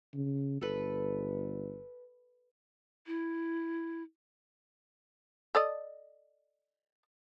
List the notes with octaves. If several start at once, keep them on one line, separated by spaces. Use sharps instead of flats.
C#3
G1 A4 B4
E4
A4 D5 D#5